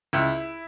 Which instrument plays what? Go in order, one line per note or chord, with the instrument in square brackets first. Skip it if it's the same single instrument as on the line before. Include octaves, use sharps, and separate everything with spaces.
[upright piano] C#2 E4